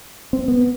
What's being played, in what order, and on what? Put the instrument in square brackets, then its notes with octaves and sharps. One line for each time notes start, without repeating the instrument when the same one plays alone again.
[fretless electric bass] C4
B3